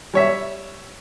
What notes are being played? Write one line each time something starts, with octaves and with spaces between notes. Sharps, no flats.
G3 C#5 E5